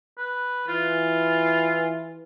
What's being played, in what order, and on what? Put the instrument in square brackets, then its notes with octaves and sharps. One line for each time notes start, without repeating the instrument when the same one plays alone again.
[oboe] B4
[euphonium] E3 [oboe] F4